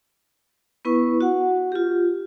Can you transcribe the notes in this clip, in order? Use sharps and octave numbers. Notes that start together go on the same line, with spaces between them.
B3 E4 B4 C#6
F#4 F#5
F4 G4